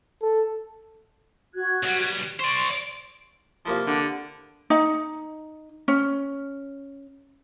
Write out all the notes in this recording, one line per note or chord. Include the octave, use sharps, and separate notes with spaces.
A4
F#4 F#6 G#6
B1 G3
C5 D5 C6 C#6
C3 F3 A#3 E4
D3
D#4
C#4